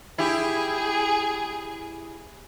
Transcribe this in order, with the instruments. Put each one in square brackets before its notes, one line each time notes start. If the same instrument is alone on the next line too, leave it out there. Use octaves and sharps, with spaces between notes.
[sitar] E4 G4 [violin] G#4